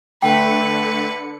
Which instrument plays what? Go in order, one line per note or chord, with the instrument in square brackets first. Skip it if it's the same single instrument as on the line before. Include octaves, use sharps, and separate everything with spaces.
[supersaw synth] D3 C#7 [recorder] A3 [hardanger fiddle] B4 [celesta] G5